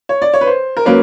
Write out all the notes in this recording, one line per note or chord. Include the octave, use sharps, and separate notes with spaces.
C#5
D5
C#5
B4
C5
A#4
F#3 A#3 C#4 B4